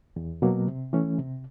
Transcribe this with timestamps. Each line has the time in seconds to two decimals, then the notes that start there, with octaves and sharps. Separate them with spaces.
0.16 E2
0.42 B2 F#3 A#3
0.68 C3
0.93 E3 A3 C#4
1.18 C3